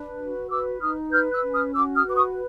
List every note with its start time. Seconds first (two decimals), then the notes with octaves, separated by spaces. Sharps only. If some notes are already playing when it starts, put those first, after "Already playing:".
Already playing: D4 B4
0.19 F#4
0.50 B4 D6 E6
0.80 D#4 D#6 F6
1.11 B4 F6 G6
1.32 E6 F#6
1.44 C#4
1.54 D#6 F6
1.74 F#4 D6 E6
1.95 D#6 F6
2.05 B4 D6
2.15 C#6 D#6